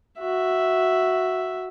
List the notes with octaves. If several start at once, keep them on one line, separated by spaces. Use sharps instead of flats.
F#4 E5